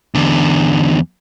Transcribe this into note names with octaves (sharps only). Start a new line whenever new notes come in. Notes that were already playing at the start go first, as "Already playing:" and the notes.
E2 D3